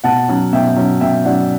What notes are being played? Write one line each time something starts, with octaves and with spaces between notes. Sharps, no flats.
B2 F#5 A5
F#3 C#4
B2 E5 G5
F#3 C#4
B2 E5 G5
F#3 C#4 D5 F#5